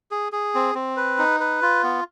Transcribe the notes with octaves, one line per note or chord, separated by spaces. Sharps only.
G#4
G#4
C4
C4
B4
D#4
B4
F4
B3